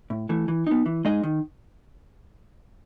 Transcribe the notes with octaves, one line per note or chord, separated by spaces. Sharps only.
A2
E3 A3
E3
B3 D#4
E3
G#3 D#4 G#4 D#5
D#3